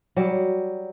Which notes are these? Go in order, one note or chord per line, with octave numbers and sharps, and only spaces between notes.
F#3 G3 G4